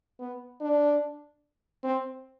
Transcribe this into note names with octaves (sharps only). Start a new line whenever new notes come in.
B3
D4
C4